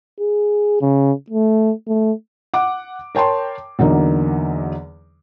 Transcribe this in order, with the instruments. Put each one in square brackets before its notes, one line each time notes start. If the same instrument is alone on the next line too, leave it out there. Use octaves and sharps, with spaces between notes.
[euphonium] G#4
C#3
A3
A3
[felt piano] F#5 D6
A#4 C#5 G5 A5 C6
E2 D3 F#3 A#3 D#4